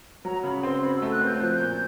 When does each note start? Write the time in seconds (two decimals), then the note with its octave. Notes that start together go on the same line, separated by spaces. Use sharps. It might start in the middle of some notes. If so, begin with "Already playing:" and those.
0.25 F#3 A#5
0.44 C#3 B5
0.63 C4 C6
0.83 C4 B5
0.97 A3 E6
1.12 F#6
1.21 C4 G6
1.40 F3 F#6
1.53 G6
1.60 A#2